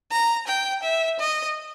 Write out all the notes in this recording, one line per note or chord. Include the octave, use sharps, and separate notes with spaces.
A#5
G5
E5
D#5